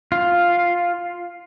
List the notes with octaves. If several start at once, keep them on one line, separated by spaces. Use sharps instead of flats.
F4